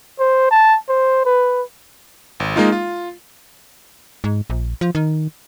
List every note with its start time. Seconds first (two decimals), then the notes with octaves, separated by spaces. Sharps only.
0.19 C5
0.51 A5
0.89 C5
1.25 B4
2.40 G#1
2.56 G#3 A#3 D#4 F4
2.72 F4
4.24 G#2
4.50 A#1
4.81 F3
4.95 D#3